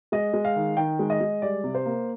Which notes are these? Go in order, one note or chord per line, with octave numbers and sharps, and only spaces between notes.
G#3 D#5
G#3
F5
D#3
D#3 G5
G#3
D#5
G#3
G3 D5
C3
C5
A#3